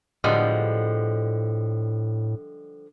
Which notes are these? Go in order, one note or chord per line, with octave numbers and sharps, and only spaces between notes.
A2 D3 F3 G3 G#3 B3 D4